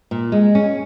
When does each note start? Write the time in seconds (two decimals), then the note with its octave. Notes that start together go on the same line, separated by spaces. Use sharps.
0.11 A#2
0.32 G#3
0.55 C#4